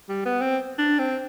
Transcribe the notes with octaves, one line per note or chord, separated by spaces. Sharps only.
G3
B3
C4
D4
C4